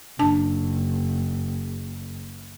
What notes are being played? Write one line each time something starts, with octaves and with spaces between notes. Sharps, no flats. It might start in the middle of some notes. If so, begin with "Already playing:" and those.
F#1 D4 A5